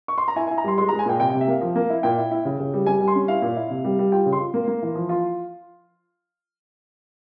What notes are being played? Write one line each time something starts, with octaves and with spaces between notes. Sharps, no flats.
C#6
C6
A#5
E4 G#5
E4 G#5
A#5
G3 C6
G#3 C6
G#3 A#5
G#5
A#2 G5
C3 G5
C3 G5
E5
A#3 F5
F3
A#3
E4
A#2 G5
E4
E4
C#3
C#3
G3
G3 G#5
G3
C6
C#4
E4 F5
A#2
E4
C3
G3
G3
F4 G5
C#3
C6
F4
A#3
A#3
E3
F3
F4